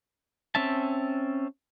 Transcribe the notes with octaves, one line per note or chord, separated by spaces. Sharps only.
C4 C#4 E5 A5